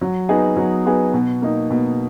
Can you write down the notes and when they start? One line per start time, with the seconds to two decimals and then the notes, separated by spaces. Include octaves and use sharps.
0.01 F#3
0.29 B3 D#4 G#4
0.57 F#3
0.86 B3 D#4 G#4
1.14 B2
1.42 A#3 D#4
1.70 B2